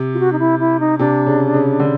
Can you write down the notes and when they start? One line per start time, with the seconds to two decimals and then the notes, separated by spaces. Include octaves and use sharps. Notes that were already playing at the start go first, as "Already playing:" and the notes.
Already playing: C3
0.14 F4
0.19 F#4
0.32 D#4
0.39 E4
0.59 E4
0.80 D#4
0.99 C3 D4
1.26 C#3
1.54 C#3
1.80 D3